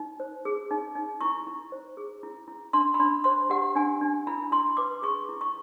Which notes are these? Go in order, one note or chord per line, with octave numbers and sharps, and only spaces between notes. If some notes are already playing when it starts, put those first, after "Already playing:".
Already playing: D#4
C5
G#4
D#4
D#4
E4 C#6
E4
C5
G#4
E4
E4
D4 C6
B5
D4 C6
C5 C6
G4 F#5
D4 G#5
D4
E4 B5
E4 C6
B4 D6
G#4 C#6
E4
C#6